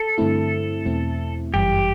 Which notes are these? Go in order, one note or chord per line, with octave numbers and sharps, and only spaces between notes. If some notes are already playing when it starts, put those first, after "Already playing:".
Already playing: A4
G2 D3 A3 C4 E4
E2 B2 A3 C4 E4
G1 F#2 E3 G3 G4